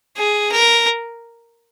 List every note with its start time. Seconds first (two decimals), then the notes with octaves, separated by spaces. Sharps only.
0.17 G#4
0.51 A#4